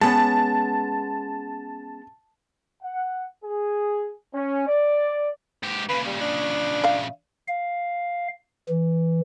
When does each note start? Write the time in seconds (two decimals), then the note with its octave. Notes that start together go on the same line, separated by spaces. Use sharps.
0.01 G#3 B3 C#4 A5
2.83 F#5
3.44 G#4
4.34 C#4
4.68 D5
5.63 G#2 G4
5.89 A#2 C#3 B4
6.06 G3
6.21 D4
6.84 E5 F5
7.48 F5
8.69 E3